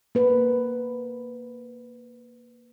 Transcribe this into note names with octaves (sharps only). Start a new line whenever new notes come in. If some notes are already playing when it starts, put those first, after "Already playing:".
A#3 B4